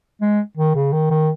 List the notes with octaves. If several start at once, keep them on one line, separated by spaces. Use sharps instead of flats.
G#3
D#3
C#3
D#3
D#3